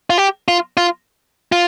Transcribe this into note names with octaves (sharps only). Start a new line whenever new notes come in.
F4
G4
F4
F4
F4